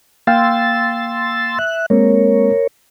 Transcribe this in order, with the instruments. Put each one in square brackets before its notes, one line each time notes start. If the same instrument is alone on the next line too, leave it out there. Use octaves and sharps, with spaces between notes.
[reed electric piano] A#3 F5 G5 [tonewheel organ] C6 E6 A6
[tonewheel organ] E5 F#6
[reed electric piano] G#3 A#3 C4 [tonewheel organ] A#4 C#5